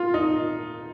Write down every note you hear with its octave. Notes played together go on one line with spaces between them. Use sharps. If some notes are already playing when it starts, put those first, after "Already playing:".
Already playing: F4
D#4